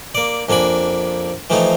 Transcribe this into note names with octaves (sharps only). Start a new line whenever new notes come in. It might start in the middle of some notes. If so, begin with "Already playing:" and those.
A#3 D5
F2 A#3 D4 G#5 B5
E3 F3 A3 C4 D#4 F4